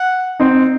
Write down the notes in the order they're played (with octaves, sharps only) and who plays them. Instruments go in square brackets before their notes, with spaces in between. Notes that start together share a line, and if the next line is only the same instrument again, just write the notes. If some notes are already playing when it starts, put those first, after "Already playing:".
Already playing: [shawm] F#5
[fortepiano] C4 D#4